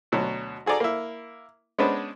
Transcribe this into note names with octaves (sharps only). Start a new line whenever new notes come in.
D2 B2 F#3
F#4 G#4 A4 D5 A#5
A#3 E4
G#3 B3 C#4 D4 B4 C5